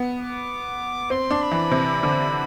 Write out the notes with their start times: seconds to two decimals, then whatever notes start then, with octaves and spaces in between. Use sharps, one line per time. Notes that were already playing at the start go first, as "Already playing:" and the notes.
Already playing: B3
0.19 D6
1.10 C4 C6
1.31 D4
1.42 B5
1.51 E3
1.71 C3
2.03 D3